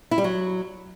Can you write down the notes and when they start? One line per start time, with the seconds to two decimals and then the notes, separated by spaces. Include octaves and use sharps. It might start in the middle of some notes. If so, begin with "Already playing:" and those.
0.11 E4
0.18 G3
0.24 F#3